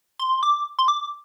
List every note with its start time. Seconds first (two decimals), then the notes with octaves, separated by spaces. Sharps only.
0.19 C6
0.43 D6
0.79 C6
0.88 D6